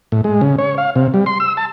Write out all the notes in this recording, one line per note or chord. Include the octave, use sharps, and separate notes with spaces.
A2
G#3
C#3
C#5
F5
C3
G3
C6
E6
A5